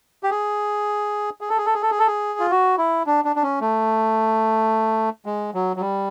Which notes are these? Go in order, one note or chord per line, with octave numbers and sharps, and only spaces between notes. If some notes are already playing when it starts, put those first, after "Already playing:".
G4
G#4
G#4
A4
G#4
A4
G#4
A4
G#4
A4
G#4
F4
F#4
E4
D4
D4
D4
C#4
A3
G#3
F#3
F#3
G3